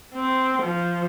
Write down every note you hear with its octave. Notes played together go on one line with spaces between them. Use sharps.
C4
F3